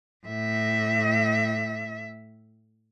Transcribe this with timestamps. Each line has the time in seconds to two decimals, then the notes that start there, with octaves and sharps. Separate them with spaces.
0.27 A2 E5